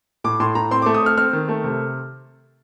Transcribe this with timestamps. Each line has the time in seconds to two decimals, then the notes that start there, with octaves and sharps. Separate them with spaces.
0.24 A2 D6
0.40 A2 C6
0.55 A2 A#5
0.71 C4 C6
0.82 A3 D6
0.95 D#6
1.02 C4 F6
1.17 C4 F6
1.33 D#3
1.48 A3
1.64 C3